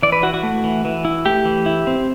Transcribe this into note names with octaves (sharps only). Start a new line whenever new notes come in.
E3 D5
B4
E4 F#4
F#4
A3
E3
E3
E4
A3 G4
E3
E4
C4